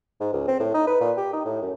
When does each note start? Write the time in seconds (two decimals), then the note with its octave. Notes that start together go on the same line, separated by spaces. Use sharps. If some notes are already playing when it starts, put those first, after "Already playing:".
0.21 G#2
0.33 C#2
0.48 C4
0.60 A2
0.74 D#4
0.87 B4
1.00 A#2
1.17 G4
1.33 D#4
1.45 A2
1.61 F#2